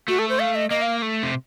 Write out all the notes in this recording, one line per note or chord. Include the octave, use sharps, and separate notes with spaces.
A3 F#4
A4
C5
F5
D#5
A#3 D#5
F5
A3
C3